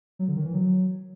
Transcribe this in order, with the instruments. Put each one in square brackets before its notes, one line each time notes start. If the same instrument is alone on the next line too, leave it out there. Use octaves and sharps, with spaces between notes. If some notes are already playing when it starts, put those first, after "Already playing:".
[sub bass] F#3
D3
D#3
E3
F#3